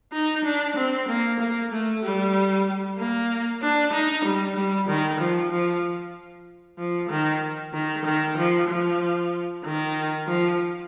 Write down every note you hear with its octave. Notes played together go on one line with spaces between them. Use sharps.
D#4
D4
C4
A#3
A#3
A3
G3
A#3
D4
D#4
G3
G3
D#3
F3
F3
F3
D#3
D#3
D#3
F3
F3
D#3
F3